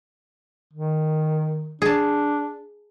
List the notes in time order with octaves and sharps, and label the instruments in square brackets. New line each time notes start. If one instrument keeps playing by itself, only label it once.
[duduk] D#3
[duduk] D4 [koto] G#4 A5